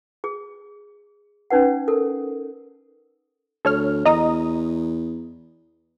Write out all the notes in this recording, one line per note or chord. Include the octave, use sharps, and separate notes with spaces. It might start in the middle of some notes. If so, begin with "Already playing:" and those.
G#4
C#4 D#4 B4 F#5
A4 A#4
D2 A4 C#5 F6
E2 D#5 A#5 D#6